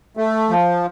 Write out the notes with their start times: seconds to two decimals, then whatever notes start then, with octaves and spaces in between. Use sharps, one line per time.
0.17 A3
0.49 F3